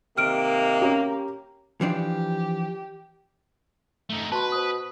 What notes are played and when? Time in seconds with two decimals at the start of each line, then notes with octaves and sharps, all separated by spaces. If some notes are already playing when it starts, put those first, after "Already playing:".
0.18 C3 D#3 A#3 F6 D7
0.81 C#4 G4 A#5
1.81 E3 F3 D4 G4
4.10 A3 D#4
4.32 B2 B4 A5 C6
4.52 C5 D#6